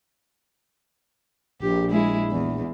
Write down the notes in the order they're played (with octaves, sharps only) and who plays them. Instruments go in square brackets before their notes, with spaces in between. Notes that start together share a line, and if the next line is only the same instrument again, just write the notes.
[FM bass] A#1 [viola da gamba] G4
[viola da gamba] G#3 E4
E2